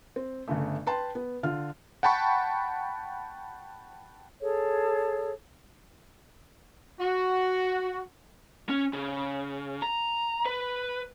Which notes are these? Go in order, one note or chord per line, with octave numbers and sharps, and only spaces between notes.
C4
G1 C#3 A3
B4 G5 A5 C6
B3
D3 F4 F6
F#5 G5 A5 B5 C#6
G#4 A4 C#5
F#4
C#4
C#3
A#5
B4